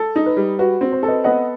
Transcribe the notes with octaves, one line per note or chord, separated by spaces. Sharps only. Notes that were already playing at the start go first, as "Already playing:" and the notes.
Already playing: A4
D#4
B4
G3
F#4 B4
C4
C5
A4
B4 D#5
B3 D#5 F#5